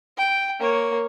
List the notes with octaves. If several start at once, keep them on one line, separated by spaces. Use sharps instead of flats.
G5
A#3 C#5